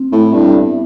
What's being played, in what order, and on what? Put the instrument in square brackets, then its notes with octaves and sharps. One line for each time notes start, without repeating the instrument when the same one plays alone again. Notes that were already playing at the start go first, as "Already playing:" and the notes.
Already playing: [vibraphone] C4
[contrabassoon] A2 [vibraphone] E4 A4 E5
[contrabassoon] G2
[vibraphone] B3